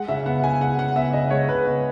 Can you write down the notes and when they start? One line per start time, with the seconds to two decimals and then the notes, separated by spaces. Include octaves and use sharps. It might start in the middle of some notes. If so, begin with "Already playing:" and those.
Already playing: G#3 F#5
0.08 C#3 E5
0.26 B3 F#5
0.42 C#3 G#5
0.61 G#3 F#5
0.78 C#3 F#5
0.96 B3 E5
1.13 C#3 D#5
1.30 G#3 C#5
1.48 C#3 B4
1.66 B3